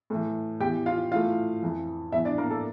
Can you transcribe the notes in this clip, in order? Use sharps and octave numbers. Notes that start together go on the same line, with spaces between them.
A2 E3
E2 E3 G4 G5
F4 F5
A2 E3 F4 F5
F2 E3
E2 E3 E4 E5
D4 D5
A#3 A#4
A4